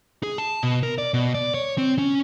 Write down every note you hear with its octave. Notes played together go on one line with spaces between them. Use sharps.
G#4
A5
B2
A#4
D5
B2
D5
C#5
C4
C#4